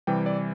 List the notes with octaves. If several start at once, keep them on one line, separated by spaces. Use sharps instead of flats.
C3 E3 G3 G5
D5